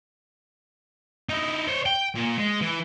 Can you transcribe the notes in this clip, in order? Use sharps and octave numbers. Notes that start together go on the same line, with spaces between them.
D#4 E4
C5 C#5
G5
A#2
G#3
E3